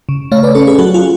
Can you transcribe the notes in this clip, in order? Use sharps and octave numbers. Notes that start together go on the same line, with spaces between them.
C#3
A3 C#5 F5
B4 D5
C#4 A4 C#5
G#4 B4
F#3 F#4 A4
F4 G#4